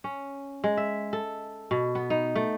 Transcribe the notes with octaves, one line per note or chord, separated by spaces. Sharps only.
C#4
G#3
E5
A4
B2
B3
D#4
A3